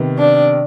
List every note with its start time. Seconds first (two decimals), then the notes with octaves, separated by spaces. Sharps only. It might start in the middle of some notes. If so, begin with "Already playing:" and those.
Already playing: C3 D#3 B3
0.18 D4